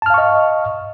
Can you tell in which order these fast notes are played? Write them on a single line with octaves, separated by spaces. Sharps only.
A5 F6 F5 C#6 D#5